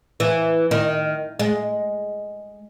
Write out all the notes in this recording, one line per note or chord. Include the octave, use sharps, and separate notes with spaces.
E3
D#3
G#3